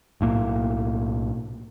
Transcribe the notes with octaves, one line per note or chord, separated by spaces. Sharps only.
B1 A2 A#3